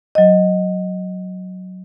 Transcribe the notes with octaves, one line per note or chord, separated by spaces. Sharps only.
F#3 D#5